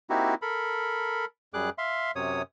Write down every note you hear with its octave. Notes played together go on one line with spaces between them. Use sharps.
A#3 C4 D#4 E4 F#4 G4
A4 A#4 B5
F#2 G3 G#4 D6 F#6
E5 F5 C6
F#2 C3 C#5 D#6